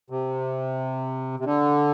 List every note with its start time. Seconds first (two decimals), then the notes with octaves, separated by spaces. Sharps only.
0.10 C3
1.40 C3
1.45 D3